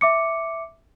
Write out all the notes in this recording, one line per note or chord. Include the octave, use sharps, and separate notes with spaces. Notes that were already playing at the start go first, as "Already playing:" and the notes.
E5 D6 C#7